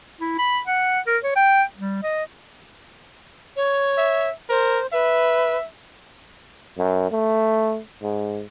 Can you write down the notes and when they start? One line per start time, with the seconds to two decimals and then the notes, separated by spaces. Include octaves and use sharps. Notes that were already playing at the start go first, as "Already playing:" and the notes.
0.21 E4
0.39 B5
0.67 F#5
1.07 A#4
1.24 C#5
1.36 G5
1.78 G3
2.03 D#5
3.56 C#5
3.98 E5
4.49 A#4 C5
4.93 B4 E5
6.78 F#2
7.11 A3
8.02 G#2